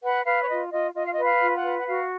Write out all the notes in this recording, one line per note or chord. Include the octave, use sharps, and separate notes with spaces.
B4 F#5
B4 F5
C#5
F4 D#5
F4 D#5
F4 D#5
F5
D#5
B4
F5
F4
F#5
B4
F#5
F#4 F5